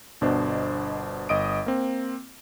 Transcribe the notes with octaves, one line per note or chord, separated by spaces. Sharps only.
G1 B2 D4 C5 D#5
G1 D#5 D#6 D7
A#3 C4